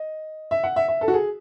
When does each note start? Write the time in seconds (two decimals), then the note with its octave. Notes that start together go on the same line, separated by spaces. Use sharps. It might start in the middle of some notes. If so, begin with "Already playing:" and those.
Already playing: D#5
0.51 E5
0.64 F#5
0.76 E5
0.88 E5
1.01 A4
1.08 F#4
1.13 G#4